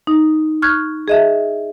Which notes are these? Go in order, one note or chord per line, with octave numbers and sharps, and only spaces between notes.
D#4
C#6 F6 F#6 G#6
G#4 D#5 E5